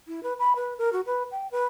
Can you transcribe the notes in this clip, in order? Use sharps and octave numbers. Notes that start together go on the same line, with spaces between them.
E4
B4
B5
B4
A#4
F#4
B4
G5
B4